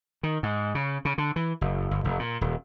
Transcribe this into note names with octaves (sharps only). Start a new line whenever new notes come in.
D#3
G#2
C#3
C#3
D3
E3
F#1
G1
F1
A#2
D#1